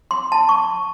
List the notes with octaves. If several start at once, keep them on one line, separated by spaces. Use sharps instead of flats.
C6
A5
C#6